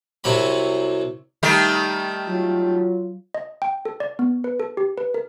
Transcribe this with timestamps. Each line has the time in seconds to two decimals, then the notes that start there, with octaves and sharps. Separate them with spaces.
0.24 C2 C3 F#3 B5
1.43 D#3 G3 A3
2.28 F#3 F4
3.34 D#5
3.62 G5
3.85 A4
4.00 D5
4.19 B3
4.44 B4
4.60 A4
4.77 G4
4.98 B4
5.14 A#4